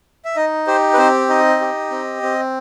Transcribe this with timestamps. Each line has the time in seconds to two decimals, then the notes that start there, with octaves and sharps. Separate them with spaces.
0.25 E5
0.36 D#4 D#5
0.67 G4 C5
0.93 B4
0.98 C4 C5
1.29 D#4 D#5
1.60 G4
1.91 C4
2.23 C4